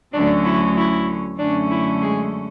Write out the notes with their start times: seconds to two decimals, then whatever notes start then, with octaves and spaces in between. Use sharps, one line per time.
0.13 D2 D3 F#3 C#4 D4
0.45 E4
0.77 E4
1.39 F#2 D3 A3 C#4 D4
1.71 E4
2.02 G#3 G#4